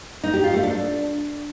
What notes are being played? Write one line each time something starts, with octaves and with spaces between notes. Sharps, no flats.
D#4
G4
F4
A3
D4